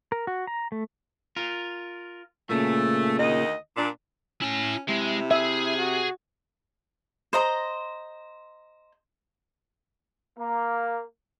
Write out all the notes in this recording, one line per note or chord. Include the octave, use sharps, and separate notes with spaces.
A#4
F#4
A#5
A3
F4 A#4
A#2 C#3 A3
D2 D#3 D#5
A#2 D4
C#4 E4 A5
C3 G#3 E4
G#4 E5
F#4
C5 D#5 A#5
A#3